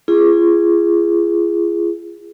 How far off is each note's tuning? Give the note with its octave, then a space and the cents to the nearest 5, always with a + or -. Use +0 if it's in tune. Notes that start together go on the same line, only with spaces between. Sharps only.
F4 -45 G#4 -5